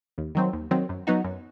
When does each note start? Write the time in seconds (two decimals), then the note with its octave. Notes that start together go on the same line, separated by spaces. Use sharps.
0.18 D#2
0.35 D#3 F#3 C4
0.53 D#2
0.71 D#3 F#3 C4
0.89 F#2
1.07 F#3 B3 D#4 F#4
1.24 F#2